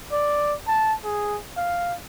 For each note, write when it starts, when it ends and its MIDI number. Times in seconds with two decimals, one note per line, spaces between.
0.12 0.54 74
0.67 0.93 81
1.04 1.38 68
1.57 1.95 77